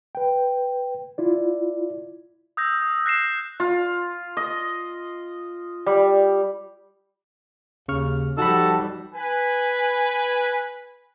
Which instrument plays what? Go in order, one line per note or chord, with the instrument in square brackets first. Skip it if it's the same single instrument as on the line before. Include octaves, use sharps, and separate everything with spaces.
[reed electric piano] B4 G5
E4 F4 D5
[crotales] D#6 E6 G6 A#6
D#6
F#6 A#6 C7 E7
[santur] F4
D#5
G3
[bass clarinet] D#2 [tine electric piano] C#3 C#6 F6
[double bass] F3 G3 [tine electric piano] D#4 B5 [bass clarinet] F#4 [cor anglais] A4
[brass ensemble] B4 G#5